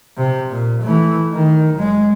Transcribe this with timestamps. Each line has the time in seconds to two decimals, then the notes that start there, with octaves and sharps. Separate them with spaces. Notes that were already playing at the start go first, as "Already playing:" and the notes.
0.17 C3
0.50 A#2
0.83 E3 A3
1.33 D#3
1.75 F#1 G#3